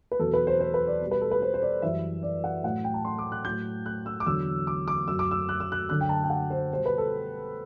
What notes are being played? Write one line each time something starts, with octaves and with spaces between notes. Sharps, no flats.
B4
E2 B2 F#3 A4
B4
C5
C5
B4
D5
B2 G3
B4
A4
B4
C5
C5
D5
F#2 E3 G3 E5
D5
F#5
A2 F#3 F#5
G5
A5
C6
D6
F#6
A2 F#3 G6
F#6
E6
D6
E2 D3 F#3 E6
D6
D6
F#2 F#3 E6
D6
E6
F#6
E6
F#6
F#2 D3 F#3 F#6
G5
A5
G5
F#5
C5
B2 G3 C5
B4
A4